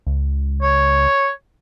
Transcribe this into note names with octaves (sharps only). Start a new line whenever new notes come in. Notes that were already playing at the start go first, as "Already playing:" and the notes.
C#2
C#5